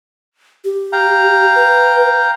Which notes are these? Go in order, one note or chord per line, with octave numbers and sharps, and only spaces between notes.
G4
F5 G5 A#5
B4